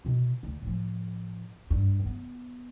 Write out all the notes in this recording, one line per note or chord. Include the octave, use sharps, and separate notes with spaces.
B2 E4
D2
A2 F3
G2
B3